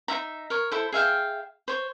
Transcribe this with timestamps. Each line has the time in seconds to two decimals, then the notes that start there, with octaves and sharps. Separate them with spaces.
0.08 D#4 E4 E5 A#5
0.50 A#4 C#5
0.72 E4 A4 C5
0.92 G#4 E5 F5 G5
1.68 C5 C#5